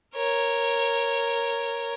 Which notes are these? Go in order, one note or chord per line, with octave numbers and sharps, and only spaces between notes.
A#4 C#5